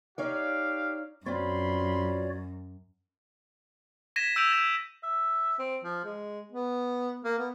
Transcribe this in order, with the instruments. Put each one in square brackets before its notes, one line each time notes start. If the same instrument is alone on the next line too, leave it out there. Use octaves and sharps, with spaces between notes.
[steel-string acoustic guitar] D#4 C#5 D5 [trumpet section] G4 F5
[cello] F#2 [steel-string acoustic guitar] C4 F4 [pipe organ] F#4 C#5 D5 [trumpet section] B5 C6
[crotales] G#6 A#6 B6 D#7 E7
E6 G6 D7 D#7 F7 F#7
E6 G#6 A#6 E7
[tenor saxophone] E5
C4
F3
G#3
B3
A#3
B3